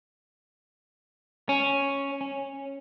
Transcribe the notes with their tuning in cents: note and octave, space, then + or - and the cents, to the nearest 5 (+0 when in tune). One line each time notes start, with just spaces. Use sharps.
C#4 +0
C#4 -10